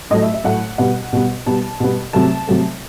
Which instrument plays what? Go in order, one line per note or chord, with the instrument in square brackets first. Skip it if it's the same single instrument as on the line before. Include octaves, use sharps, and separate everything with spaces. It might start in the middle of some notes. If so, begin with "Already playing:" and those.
[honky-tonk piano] A2 F#3 A3 D#5
E5
E5
A2 F#3 A3 F#5
B2 G3 B3 F#5
B2 G3 B3
B2 G3 B3 A5
B2 G3 B3
C3 F#3 A3 A5
C3 F#3 A3